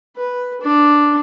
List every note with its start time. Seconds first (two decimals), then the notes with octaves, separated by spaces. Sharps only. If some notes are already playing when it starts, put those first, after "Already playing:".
0.16 B4
0.61 D4